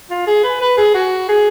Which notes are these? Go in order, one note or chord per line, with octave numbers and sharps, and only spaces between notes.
F4
G#4
B4
B4
G#4
F#4
G#4